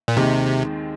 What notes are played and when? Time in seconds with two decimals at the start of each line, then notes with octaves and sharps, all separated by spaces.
0.08 A#2
0.16 D#2 C3 D#3 G#3 C4